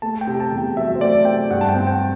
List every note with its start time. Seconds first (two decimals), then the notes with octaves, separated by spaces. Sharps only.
0.02 A3 A5
0.21 G5
0.27 C3
0.40 A5
0.52 E2
0.58 G5
0.77 F#3 E5
0.95 C5
1.01 A3 D5
1.25 C3 G5
1.50 G2 F#5
1.61 A5
1.69 G5
1.75 C4
1.87 G5